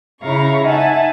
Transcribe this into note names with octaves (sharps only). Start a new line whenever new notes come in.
C#3 E4 F5 A#5 C#6
D#4 E5 F#5 G#5 A5